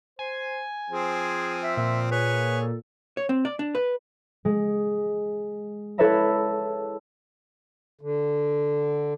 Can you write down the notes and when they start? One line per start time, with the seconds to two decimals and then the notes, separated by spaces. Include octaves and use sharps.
0.19 C5 G#5
0.90 F3 C4 G#4
1.64 E5
1.77 A#2 E5
2.11 G#4 B4 C#5
2.61 A4
3.17 C#5
3.29 C4
3.45 D5
3.59 D4
3.75 B4
4.45 G#3
5.98 E4 A4 B4 C#5 E5 A#5
8.01 D3